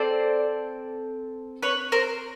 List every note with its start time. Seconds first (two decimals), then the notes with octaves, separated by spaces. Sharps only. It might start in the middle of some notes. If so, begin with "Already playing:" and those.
Already playing: C4 A4 C5 D5
1.62 B4 C#5
1.92 A#4 C5